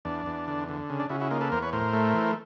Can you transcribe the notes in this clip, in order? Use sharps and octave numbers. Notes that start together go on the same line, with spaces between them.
E2 D4
E2
D3
D3
C#3
D4
C#3 E4 F#4
E4 F#4
A#3 D#4 F4
A4 B4
E2 A#4 C5
B4 C#5
A2 A#4 C5
A3
E3